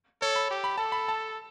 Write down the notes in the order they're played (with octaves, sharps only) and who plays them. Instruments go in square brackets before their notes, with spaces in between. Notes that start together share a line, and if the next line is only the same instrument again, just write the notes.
[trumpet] A4 [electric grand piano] C#5
[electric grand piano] B5
[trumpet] G4
[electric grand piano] B5
[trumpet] A4 [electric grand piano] A5
[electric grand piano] B5
A5